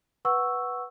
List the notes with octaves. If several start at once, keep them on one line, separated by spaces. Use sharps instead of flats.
B4 F#5 C#6 E6